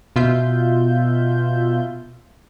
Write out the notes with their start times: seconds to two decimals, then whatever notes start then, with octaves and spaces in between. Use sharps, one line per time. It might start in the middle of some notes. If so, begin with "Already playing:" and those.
0.16 B2 F4 E5 G6